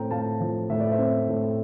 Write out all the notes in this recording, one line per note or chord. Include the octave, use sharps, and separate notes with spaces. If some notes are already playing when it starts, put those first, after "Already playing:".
Already playing: A2 C4 G5 A#5
A2 F5 A5
F3
A2 E5
D5
C5 E5
C4
A2